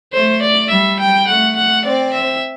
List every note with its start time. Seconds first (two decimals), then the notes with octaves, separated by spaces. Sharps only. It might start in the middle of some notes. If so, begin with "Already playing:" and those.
0.13 A3 C5
0.42 D5
0.70 G3 E5
1.00 G5
1.27 A3 F#5
1.56 F#5
1.84 C4 D5
2.13 E5